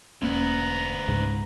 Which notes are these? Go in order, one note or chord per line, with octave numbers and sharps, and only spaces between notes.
E1 D2 A#3 B3 C#4 A#5
C#2 G#2 C#3